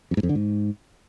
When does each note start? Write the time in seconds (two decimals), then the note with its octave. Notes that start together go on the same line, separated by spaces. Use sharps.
0.11 F2
0.17 G#2
0.23 F2
0.29 D3
0.35 G#2